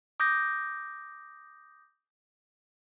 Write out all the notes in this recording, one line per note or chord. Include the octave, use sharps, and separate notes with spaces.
D6 D#6 G6 A#6